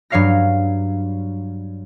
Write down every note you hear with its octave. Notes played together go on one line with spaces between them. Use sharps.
G2 F#3 C#5 F5 F6 A#6